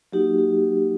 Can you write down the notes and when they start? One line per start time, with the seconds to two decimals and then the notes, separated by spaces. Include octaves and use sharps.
0.13 F#3 A#3 D#4 F#4 G4
0.38 G4